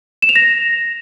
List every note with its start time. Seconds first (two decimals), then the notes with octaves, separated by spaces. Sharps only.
0.22 E7
0.29 F7
0.36 A#6